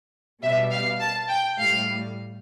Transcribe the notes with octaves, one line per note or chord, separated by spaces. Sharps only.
B2 G3 E5
F5
A5
G5
A2 G3 F5